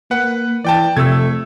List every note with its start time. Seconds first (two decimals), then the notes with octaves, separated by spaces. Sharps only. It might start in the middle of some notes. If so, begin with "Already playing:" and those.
0.11 A#3 B4 F#5
0.64 E3 D5 G5 A5
0.97 F2 C3 A3 E6 G#6